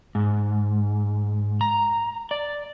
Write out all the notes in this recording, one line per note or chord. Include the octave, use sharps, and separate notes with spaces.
G#2
A#5
D5